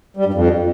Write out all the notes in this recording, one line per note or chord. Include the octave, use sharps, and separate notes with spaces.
G3
G2
F2